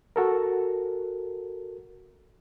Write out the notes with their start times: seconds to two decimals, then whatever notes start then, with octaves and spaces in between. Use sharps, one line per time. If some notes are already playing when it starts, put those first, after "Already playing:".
0.16 F#4 A4 A#4